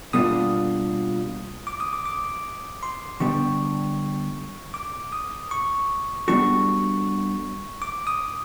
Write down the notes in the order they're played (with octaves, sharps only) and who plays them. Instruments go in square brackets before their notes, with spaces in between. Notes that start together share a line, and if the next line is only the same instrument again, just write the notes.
[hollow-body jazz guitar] B2 G3 A#3 D4 F4 [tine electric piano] D#6
[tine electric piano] D6
D#6
D6
D6
C6
[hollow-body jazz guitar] D3 G3 B3 D4 G4 [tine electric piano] C#6
[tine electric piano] D6
D#6
C#6
[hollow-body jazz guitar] G3 B3 D4 F#4 A4 [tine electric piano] C#6
[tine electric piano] D6
D#6